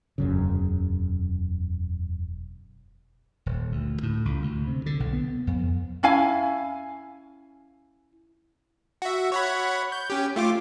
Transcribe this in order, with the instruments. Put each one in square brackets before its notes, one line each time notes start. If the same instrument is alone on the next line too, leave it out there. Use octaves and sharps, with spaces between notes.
[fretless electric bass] E1 F#2 C#3
[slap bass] D#1
D2
A2
C#2
D2
C3
D3
B1
B3
F2
[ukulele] C#4 E4 F5 G#5
[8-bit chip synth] F#4 E5
C#5 F#5 B5
G6
C#4 G4
A3 F4 D6